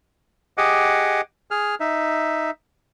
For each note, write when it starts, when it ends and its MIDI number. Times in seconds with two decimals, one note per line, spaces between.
0.58 1.21 67
0.58 1.21 68
0.58 1.21 75
0.58 1.21 78
0.58 1.21 86
1.51 1.75 68
1.51 1.75 89
1.80 2.51 63
1.80 2.51 76